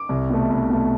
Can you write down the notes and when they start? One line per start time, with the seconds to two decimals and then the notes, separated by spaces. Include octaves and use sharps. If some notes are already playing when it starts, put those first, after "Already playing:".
Already playing: D6
0.09 C2
0.30 B2 A3
0.50 C2
0.70 B2 A3